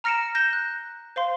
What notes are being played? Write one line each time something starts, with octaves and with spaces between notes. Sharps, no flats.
A#5 F6 A#6 C#7 D7 E7
G6 A#6 E7 G7
F#6
C5 F5 C6